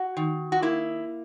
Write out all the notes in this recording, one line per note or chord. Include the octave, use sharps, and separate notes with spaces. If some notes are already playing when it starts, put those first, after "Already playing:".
Already playing: F#4
D#3
F#4
A#3 E4